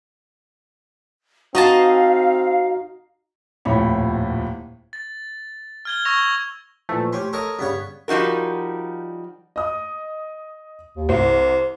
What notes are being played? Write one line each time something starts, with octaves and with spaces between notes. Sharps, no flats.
C4 D#4 F#4 D#5 F5 A5
D#1 F2 A2 C#5 B5
A6
F6 G#6 G7
C#6 E6 G#6 A#6 F7 G7
A#2 E3 F3 A3
C#4 G4 G5 C6
A4 A#4 C#5 D#5
G2 C#3 G3 B3 C#5
F3 G3 D#4 F#4 A#4
D#5 D#6
D#2
C2 C5